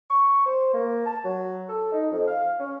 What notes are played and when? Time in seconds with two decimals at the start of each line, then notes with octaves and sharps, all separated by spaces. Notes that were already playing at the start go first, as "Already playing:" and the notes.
0.10 C#6
0.46 C5
0.73 A#3
1.06 A5
1.25 F#3
1.69 A4
1.92 D#4
2.12 F2
2.28 F5
2.59 C#4